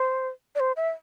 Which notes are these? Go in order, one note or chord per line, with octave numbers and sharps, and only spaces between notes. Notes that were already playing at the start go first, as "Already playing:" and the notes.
Already playing: C5
D5
C5
E5